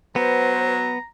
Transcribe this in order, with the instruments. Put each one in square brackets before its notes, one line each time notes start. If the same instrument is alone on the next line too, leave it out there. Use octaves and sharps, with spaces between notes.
[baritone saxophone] F#3 [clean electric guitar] B3 [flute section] B4 C5 [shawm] A#5